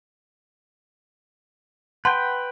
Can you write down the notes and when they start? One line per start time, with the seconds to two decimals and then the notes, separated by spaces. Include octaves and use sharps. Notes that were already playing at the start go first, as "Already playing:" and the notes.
2.05 B4 F#5 G5 A5 C6